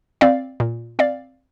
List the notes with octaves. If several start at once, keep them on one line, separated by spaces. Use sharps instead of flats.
C4 D5 F5
A#2
C4 D5 F5